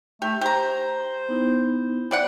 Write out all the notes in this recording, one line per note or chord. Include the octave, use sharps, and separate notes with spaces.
A3 G4
G4 C5 A#5
B3 D#4 E4
G3 D5 F#5